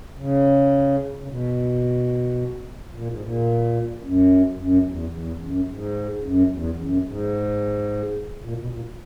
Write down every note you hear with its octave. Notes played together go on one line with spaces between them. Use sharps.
C#3
C#3
B2
A#2
G#2
A#2
F#2
F#2
E2
E2
F#2
G#2
F#2
E2
F#2
G#2
A#2
B2
A#2